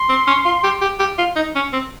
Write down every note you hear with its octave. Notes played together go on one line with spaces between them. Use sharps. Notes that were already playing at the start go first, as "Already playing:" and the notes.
Already playing: C6
C4
C#4
F4
G4
G4
G4
F4
D#4
C#4
C4